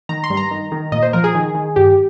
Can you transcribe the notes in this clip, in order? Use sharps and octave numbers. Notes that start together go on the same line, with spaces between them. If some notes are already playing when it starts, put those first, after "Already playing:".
D#3 A#5
C6
G2
A#5
D#3
D#3
A#2 D#5
C5
F3 A#4
G#4
D#3
D#3
G2 G4